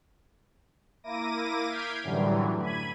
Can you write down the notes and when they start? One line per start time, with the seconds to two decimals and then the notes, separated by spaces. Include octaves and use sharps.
1.04 A#3 E4 D6 A#6 D#7
1.68 F6 G6 G#6 B6 C7 D7
2.03 F#2 A2 D3 E3 F#3 G3
2.60 B5 G#6 D#7